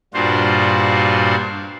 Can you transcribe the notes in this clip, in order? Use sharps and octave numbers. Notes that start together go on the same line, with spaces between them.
G2 A#2 D4 F4 F#4 C5